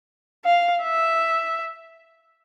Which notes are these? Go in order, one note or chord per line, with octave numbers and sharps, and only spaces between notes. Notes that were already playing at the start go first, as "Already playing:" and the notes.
F5
E5